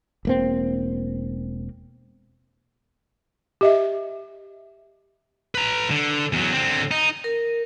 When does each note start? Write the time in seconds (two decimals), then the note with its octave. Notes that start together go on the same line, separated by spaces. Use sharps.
0.25 E1 A#3 C4
3.61 G4 D#5 E5
5.55 B4 A#5
5.91 D3
6.33 E2 F#3
6.53 D3 C4
6.91 D#4
7.24 A#4